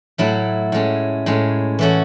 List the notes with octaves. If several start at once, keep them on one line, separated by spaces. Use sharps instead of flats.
A2 F#3 A3 E4
A2 G#3 C#4
A2 G#3 C#4
E3 A3 C#4 F#4